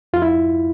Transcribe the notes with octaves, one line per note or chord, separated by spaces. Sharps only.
F2 F4
E4